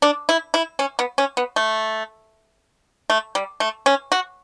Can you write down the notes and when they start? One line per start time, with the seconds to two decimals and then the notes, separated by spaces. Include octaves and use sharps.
0.02 D4
0.29 E4
0.54 E4
0.79 C#4
0.99 B3
1.18 C#4
1.37 B3
1.56 A3
3.10 A3
3.35 G3
3.60 A3
3.86 C#4
4.12 F#4